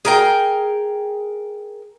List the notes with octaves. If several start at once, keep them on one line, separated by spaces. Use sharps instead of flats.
G#4 A#4 G5